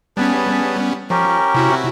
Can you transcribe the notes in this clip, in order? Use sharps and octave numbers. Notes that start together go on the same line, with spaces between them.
G3 B3 C#4 G#4 B4 A5
F3 C#4 G4 A#4
C3 E4 F#4